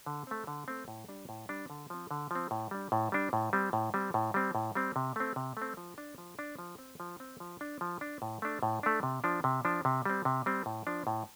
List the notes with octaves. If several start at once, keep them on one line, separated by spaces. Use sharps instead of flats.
D3
A3 C4
D3
A3 C4
A2
G3 D4
A2
G3 D4
D3
F3 C4
D3
F3 C4
A2
G3 D4
A2
G3 D4
A2
G3 C4
A2
G3 C4
A2
G3 C4
A2
G3 C4
C3
A3 C4
C3
A3 C4
F3
D4
F3
D4
F3
C4
F3
C4
F3
D4
F3
D4
A2
A3 D4
A2
A3 D4
C3
F3 D4
C3
F3 D4
C3
G3 C4
C3
G3 C4
A2
F3 D4
A2